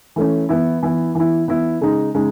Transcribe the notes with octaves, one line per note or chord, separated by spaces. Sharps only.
E3 A3 C#4
E3 B3 E4
E3 B3 E4
E3 B3 E4
E3 B3 E4
C#3 G#3 D#4
C#3 G#3 D#4